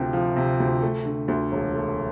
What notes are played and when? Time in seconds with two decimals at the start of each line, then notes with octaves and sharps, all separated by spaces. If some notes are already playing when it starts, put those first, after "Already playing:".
Already playing: D2 C3 F3 C4
0.13 F3
0.36 C3
0.60 D2
0.82 A3
1.06 D3
1.28 D2
1.52 E1
1.75 A3